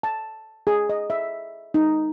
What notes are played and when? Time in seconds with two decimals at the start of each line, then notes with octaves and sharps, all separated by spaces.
0.03 A5
0.67 G#4
0.89 D#5
1.10 E5
1.74 D#4